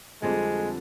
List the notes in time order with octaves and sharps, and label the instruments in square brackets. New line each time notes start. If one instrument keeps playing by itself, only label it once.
[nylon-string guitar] F2 D3 G3 C4 [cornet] G#3